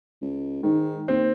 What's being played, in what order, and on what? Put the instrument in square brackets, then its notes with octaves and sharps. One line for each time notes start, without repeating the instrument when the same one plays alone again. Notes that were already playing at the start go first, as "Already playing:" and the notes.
[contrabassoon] C#2
[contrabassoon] G#2 [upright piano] D#3
[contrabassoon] D#2 [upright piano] C4